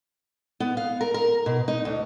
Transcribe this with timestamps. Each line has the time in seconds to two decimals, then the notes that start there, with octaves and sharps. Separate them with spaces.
0.60 B3
0.77 F5
1.01 A#4
1.14 A#4
1.46 B2
1.68 D#4
1.85 D2